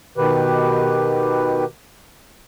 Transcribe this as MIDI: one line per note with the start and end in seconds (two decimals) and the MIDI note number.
0.17 1.65 47
0.17 1.65 51
0.17 1.65 67
0.17 1.65 71